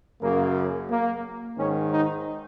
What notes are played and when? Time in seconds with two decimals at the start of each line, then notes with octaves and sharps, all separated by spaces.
0.21 F#2 C#3 A#3
0.89 A#3
1.57 G#2 D#3 C#4
1.91 D#4